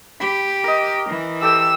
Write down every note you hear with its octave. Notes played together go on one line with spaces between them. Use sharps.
G4 B5
A#4 D#5
E3
G4 A4 G5 E6